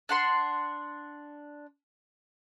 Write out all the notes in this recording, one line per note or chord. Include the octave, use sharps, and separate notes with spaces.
D4 F#5 C6